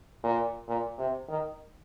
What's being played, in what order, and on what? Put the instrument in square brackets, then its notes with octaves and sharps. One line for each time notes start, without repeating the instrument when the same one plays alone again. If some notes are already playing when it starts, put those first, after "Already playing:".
[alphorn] A#2
A#2
C3
D#3